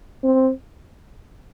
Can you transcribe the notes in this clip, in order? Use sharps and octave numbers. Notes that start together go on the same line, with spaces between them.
C4